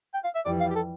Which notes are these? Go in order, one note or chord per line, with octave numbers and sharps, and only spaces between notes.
G5
F5
E5
F2 E3 G3 D5
F5
G4
A4